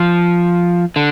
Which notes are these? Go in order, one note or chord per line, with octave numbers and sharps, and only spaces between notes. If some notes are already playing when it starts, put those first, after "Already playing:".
Already playing: F3
D3